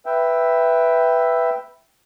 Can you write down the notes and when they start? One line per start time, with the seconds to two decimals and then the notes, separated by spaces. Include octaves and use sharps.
0.06 B4 E5 G5